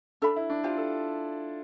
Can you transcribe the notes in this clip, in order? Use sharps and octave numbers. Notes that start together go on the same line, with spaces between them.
D4 A4 E5 B5
E4
D4
F4 G4 C5 G5
A4